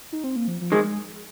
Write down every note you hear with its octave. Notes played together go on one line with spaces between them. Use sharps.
D#4
C4
A#3
F3
F3
D#3 G#3
G#3